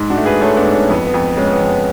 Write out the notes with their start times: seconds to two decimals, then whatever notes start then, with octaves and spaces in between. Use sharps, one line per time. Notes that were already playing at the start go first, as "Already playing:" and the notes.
Already playing: G#2
0.10 D4 F#4
0.17 A3
0.25 G#4 B4
0.41 A3 A4 C#5
0.57 B3 D4
0.65 G#2
0.73 C#4
0.89 F2 B3
1.07 B3
1.14 F2
1.37 G#3 C#4
1.53 B3
1.61 F2
1.69 B3